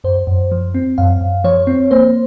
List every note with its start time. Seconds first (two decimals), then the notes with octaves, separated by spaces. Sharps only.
0.04 F#2 C5
0.27 F#2
0.51 F3
0.75 C4
0.98 F#2 F5
1.21 F#2
1.44 F3 C#5
1.67 C4
1.91 A#3 C5